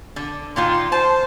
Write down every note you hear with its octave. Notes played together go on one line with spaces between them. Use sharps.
D3
A#2 D#3 F4 C6
C5 A5